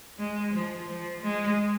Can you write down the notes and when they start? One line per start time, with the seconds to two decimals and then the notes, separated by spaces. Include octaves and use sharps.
0.19 G#3
0.54 F3
0.88 F3
1.22 G#3